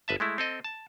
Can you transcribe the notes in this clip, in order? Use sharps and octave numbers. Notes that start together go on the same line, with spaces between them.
G1 B4 E5 A5
G#3 A3 E4
C4 A4 D#5
A5